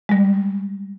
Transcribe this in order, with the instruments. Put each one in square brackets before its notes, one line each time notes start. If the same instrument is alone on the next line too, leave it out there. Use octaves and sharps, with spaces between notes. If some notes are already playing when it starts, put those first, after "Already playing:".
[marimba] G3 G#3